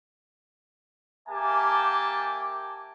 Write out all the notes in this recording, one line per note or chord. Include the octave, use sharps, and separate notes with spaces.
A#3 G4 E5 G#5 A5